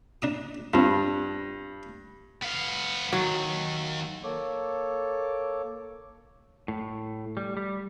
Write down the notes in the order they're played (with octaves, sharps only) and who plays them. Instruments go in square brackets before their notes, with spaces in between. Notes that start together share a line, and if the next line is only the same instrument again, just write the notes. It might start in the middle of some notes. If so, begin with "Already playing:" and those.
[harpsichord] D4 A#5 D#6
[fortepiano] G2 [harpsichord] C4 F4
[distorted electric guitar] B3 F5
[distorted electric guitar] D#2 [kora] F#3
[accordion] A#3 A4 C#5 D6
[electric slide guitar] A2
G3
G3